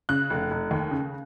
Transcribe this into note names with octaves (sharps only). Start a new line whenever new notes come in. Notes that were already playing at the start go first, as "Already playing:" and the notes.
C#3 F#6
F1
F1
D#2
C#3